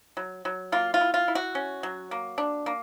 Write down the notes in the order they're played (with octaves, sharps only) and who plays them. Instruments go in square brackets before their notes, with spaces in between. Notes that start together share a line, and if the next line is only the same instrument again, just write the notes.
[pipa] F#3
F#3
A#3 F4
F4
E4
F4
E4
F#4
C#4
F#3
A#3
D4
A#3